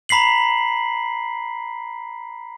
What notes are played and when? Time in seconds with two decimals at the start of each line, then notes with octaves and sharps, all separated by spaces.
0.09 A#5 B5 B6 C7 F#7